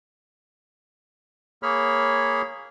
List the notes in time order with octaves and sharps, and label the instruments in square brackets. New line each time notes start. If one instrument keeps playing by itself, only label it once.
[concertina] A#3 G#4 C#5 B5 F6